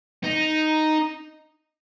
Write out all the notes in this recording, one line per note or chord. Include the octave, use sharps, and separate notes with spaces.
D#4